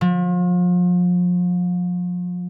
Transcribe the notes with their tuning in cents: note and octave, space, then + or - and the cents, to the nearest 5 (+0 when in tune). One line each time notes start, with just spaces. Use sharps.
F3 +35